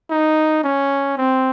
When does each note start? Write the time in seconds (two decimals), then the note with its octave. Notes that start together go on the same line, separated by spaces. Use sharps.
0.10 D#4
0.64 C#4
1.18 C4